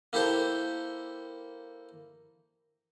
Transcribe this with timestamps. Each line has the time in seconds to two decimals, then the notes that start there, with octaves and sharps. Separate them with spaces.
0.13 A#3 E4 G4 A4 C5